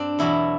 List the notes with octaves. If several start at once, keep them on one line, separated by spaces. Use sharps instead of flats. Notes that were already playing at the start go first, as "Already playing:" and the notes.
Already playing: G2 G3 C4 D4
E2 B2 F#3 E4